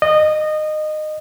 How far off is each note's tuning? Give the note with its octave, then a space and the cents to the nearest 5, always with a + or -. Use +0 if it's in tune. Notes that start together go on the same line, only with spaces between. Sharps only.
D#5 -20